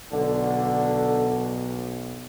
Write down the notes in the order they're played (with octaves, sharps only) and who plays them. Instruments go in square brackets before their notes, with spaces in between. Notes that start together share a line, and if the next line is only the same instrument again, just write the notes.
[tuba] B1 [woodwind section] D3